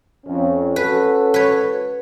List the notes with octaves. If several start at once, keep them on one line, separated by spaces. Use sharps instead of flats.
F2 C#4
C#4 F#4 A4 B4
B4 C#5